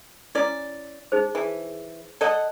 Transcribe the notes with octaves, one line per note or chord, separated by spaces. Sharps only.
C#4 E4 D5
D#4 G#4 C5
E3
A4 D5 D#5 F#5